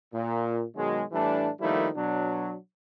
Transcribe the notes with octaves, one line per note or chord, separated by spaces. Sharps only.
A#2
B2 D#3 F#3 G#3
A2 E3 G3 A3 D4
D#3 F3 G3 A3 A#3 E4
B2 F#3 D4